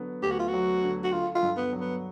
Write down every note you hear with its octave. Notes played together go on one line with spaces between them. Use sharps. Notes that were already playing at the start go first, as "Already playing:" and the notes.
Already playing: D3 F#3 B3
D2 G4
F#4
F4
F#4
F#3
D3
F#4
D3 F4
F4
G2
B3
F#3
B3